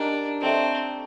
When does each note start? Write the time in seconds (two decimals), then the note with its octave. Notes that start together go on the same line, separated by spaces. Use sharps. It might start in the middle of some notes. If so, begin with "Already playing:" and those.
Already playing: D4 D#4 G4 A#4 D#5
0.42 A3 C4 D4 A4 D#5